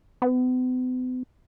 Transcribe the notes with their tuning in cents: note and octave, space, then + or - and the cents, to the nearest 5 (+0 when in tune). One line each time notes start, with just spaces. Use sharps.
B3 +45